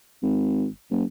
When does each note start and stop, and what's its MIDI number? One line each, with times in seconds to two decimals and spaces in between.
0.23 0.66 32
0.91 1.03 30